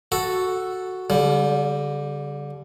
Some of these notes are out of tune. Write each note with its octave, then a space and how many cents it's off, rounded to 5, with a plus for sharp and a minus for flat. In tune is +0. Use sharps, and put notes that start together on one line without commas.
F#4 +0 A4 +0
D3 -40 G3 +0